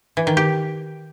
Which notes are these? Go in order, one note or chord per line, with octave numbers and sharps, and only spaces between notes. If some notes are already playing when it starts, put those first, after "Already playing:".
E3
D#3
G4